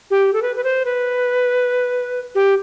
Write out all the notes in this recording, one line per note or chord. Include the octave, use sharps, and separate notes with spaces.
G4
A4
B4
B4
C5
B4
G4